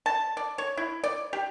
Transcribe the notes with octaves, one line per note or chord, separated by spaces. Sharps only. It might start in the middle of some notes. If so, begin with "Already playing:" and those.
A5
D5
C#5
E4
D5
G4